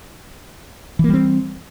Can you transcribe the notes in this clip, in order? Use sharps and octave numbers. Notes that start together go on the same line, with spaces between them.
E3 G3 A#3 C4